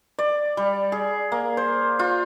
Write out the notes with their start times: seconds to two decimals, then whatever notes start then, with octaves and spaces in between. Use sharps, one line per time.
0.19 D5
0.57 G3
0.92 G#4
1.32 A#3
1.57 C5
1.99 F4